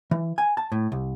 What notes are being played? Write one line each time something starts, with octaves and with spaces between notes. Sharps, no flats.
E3
G#5
A5
A2
C2